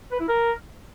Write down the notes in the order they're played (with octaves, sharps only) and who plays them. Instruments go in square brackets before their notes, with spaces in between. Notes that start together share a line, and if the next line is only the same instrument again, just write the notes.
[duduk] B4
E4
A#4